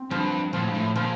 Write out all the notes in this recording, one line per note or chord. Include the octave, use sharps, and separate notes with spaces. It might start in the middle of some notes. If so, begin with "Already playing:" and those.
Already playing: C4
G2 F3
A#2 F3
A2
G2
A2
A#2 F3